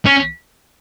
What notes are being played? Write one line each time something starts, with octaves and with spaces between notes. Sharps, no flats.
C#4